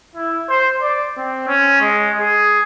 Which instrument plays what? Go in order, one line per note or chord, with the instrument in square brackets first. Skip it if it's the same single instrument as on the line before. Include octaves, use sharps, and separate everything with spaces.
[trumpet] E4
C5
D5
C4
C#4
G#3
G#4